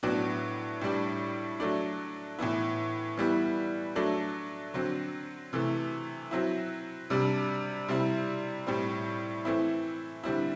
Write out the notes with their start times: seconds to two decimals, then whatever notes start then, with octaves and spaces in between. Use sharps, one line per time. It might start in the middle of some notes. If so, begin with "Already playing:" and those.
0.03 A2 F#3 B3 D4
0.81 A2 G3 D4
1.60 F#3 A3 D4
2.39 A2 E3 B3 E4
3.17 E3 G3 B3 E4
3.96 F#3 A3 D4
4.74 D3 F#3 C4
5.53 C3 E3 A3
6.31 F#3 C4 E4
7.10 C3 G3 D4
7.88 C3 G3 C4 E4
8.67 A2 G3 C4
9.45 E3 A3 C4 E4
10.24 D3 G3 C4 E4